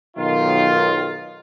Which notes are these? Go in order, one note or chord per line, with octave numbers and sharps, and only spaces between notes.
B1 D#3 F4